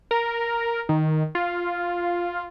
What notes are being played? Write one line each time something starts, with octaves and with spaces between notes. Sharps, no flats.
A#4
D#3
F4